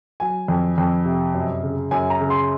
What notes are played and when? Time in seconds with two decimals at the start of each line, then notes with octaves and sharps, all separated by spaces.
0.20 F#3 G#5
0.48 F2
0.78 F2
1.06 C3
1.34 F#2
1.63 C#3
1.91 F#2 G#5
2.10 A#5
2.20 C#3
2.30 C6